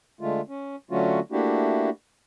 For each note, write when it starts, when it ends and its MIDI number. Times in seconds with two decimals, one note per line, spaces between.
0.21 0.41 50
0.21 0.41 56
0.21 0.41 57
0.21 0.41 65
0.49 0.76 61
0.91 1.20 50
0.91 1.20 54
0.91 1.20 57
0.91 1.20 61
0.91 1.20 65
0.91 1.20 66
1.32 1.90 57
1.32 1.90 58
1.32 1.90 62
1.32 1.90 64
1.32 1.90 66
1.32 1.90 67